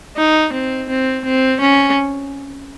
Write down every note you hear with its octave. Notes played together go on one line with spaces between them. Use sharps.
D#4
C4
C4
C4
C#4